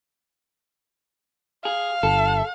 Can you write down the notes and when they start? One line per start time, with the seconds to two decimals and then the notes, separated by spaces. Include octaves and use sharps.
1.65 G#4 F5
2.03 G1 A4